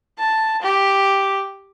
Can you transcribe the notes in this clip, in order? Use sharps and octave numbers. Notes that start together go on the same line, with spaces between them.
A5
G4